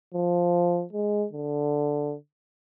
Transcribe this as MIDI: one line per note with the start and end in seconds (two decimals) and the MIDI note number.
0.14 0.84 53
0.93 1.27 56
1.33 2.15 50